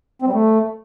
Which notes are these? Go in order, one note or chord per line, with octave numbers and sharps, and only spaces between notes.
C4
G3
A3